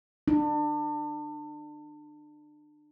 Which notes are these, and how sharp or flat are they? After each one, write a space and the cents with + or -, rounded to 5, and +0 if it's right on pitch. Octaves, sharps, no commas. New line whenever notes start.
D4 +30